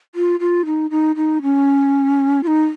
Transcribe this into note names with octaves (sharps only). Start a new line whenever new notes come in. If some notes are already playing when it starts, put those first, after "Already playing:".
F4
F4
D#4
D#4
D#4
C#4
F4
D#4